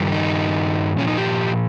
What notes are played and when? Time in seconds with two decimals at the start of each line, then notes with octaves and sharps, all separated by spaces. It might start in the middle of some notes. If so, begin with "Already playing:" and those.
Already playing: G2 D#3 G3
0.12 D#4
0.98 A#2 F3 C#4
1.08 D#4
1.17 G4